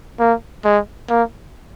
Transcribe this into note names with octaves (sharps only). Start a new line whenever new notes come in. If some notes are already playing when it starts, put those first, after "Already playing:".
A#3
G#3
A#3